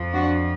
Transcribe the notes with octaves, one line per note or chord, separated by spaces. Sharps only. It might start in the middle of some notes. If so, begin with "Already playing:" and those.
Already playing: F2 F3
D4 F#4